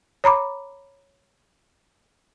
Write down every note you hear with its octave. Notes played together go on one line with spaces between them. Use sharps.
C#5 A#5 B5 D6